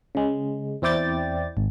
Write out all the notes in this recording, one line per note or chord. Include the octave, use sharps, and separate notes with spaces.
C#3 G#3
E2 C4 E4 D5 G5 A6
G#1